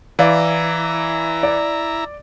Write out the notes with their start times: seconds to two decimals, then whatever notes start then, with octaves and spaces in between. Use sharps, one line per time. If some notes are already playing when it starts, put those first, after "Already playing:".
0.19 E3 E4 D5 F5 A#5
1.43 D5